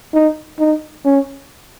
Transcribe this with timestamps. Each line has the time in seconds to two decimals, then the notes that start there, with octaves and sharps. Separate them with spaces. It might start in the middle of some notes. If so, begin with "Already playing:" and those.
0.14 D#4
0.59 D#4
1.05 C#4